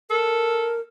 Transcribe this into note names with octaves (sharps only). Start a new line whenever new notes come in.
A4 A#4